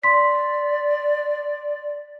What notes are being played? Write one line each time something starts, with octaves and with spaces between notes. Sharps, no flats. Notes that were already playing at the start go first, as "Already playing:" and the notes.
D5 C6 B6